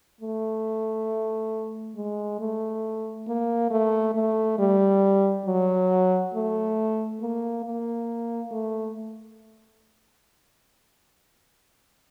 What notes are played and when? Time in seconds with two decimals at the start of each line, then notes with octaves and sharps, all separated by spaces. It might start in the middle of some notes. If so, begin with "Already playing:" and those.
0.21 A3
1.96 G#3
2.40 A3
3.28 A#3
3.71 A3
4.15 A3
4.59 G3
5.46 F#3
6.34 A3
7.22 A#3
7.65 A#3
8.52 A3